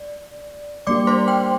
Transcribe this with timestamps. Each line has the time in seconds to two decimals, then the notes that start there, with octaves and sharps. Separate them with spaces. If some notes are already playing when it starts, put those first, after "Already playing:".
Already playing: D5
0.87 G3 A#3 D4 G4 D5 D6
1.07 C5 C6
1.28 G5